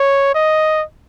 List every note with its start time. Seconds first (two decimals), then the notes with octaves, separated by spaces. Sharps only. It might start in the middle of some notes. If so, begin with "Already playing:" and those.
Already playing: C#5
0.35 D#5